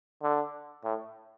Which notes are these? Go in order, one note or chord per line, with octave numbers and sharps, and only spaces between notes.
D3
A2